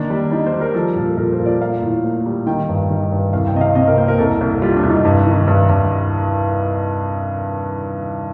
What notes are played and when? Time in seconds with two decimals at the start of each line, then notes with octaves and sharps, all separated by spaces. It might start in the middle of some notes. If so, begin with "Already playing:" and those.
Already playing: D#3 A#3 D4
0.10 G3
0.31 G3 D#4
0.46 C5
0.53 G3
0.61 A#4
0.74 F3 A4
0.96 A#2 A4
1.17 A#2 A#4
1.33 C5
1.40 A#2
1.46 D5
1.60 A#3 F5
1.82 A2
2.04 A#3
2.26 G3
2.46 D#3 G5
2.69 G2
2.90 D#3
3.12 G2
3.33 C2 F5
3.47 G5
3.54 C3 D#5
3.61 F5
3.75 C3 D#5
3.87 A#4
3.97 A#3 C5
4.08 A#4
4.18 C2 A4
4.41 C2
4.62 G3 F4
4.76 D4
4.83 C2
4.90 D#4
5.05 G2
5.27 D#3
5.47 G2
5.69 G2